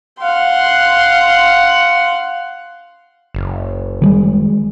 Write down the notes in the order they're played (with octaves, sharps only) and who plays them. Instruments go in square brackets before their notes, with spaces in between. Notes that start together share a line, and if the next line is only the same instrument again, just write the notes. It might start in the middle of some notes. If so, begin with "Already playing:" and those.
[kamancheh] F5 C6 [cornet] F#5
[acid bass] F#1
[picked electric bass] D#3 G3 G#3